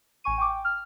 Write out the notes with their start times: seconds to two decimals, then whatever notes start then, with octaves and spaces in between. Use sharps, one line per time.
0.24 A1 G#5 C#6 D#7
0.38 G5 C#6 D6
0.49 G5
0.65 F6